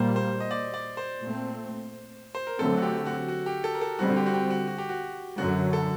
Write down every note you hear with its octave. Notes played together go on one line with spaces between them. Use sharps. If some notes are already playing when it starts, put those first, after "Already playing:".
Already playing: A#2 G3 A#3 C5
C5
D#5
D5
D5
C5
A#2 A3 C4
C5
A#4
D3 F#3 A3 C4 A4
F#4
G4
F#4
F#4
G4
A4
A#4
A4
D3 G3 C4 F#4
G4
F#4
G4
F#4
F#4
G4
F#4
F#2 D3 F#3 F#4
A4